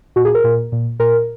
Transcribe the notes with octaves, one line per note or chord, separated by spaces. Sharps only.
A#2 F#4
G#4
A#4
A#2
A#2
A#2 A#4